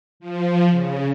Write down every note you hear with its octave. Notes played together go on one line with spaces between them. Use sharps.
F3
C#3